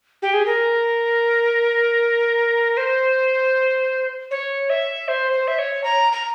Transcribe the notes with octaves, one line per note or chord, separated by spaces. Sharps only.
G4
G#4
A#4
C5
C#5
E5
C5
C5
E5
C#5
A#5
A#5